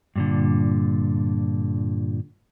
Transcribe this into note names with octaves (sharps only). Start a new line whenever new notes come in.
G2 A#2 D3